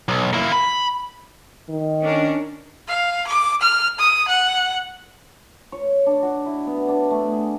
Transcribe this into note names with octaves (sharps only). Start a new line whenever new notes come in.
B1
A#3 E4
B5
D#3
C#4 D4 A#4
F5
D6
F6
D#6
F#5
C#5
D4
F#4
E4
B3
D4
A3
G#4